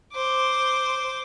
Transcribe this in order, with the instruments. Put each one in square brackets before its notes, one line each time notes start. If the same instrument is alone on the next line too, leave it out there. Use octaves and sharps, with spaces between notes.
[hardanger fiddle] C5 D6